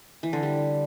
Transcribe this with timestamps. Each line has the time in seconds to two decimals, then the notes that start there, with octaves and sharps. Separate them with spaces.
0.23 E3
0.33 D3
0.43 G3